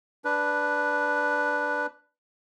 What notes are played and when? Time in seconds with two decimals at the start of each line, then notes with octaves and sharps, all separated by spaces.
0.25 D4 B4